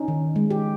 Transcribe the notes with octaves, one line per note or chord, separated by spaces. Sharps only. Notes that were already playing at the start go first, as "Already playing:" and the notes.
Already playing: C#4 D#4
D#3
G#3
G4